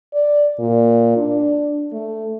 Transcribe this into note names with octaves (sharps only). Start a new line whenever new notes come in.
D5
A#2
D4
A3